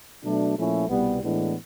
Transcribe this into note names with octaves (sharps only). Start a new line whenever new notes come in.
B2 F#3 A3 D4
A#2 F3 A3 C#4 E4
C2 B2 G3 B3
A2 E3 G#3 B3 D4